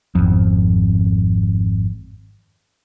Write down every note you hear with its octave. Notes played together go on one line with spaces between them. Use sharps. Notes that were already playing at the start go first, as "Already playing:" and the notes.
G#1 F2